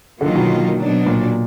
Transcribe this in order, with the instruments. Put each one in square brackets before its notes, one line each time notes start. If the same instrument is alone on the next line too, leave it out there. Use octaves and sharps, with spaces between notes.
[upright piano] D3 [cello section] D#3 F#3 A#3 F4
[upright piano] B2
[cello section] B2 F#3 D4
[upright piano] A#2